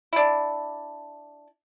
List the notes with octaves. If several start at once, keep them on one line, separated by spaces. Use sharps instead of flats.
D4 E4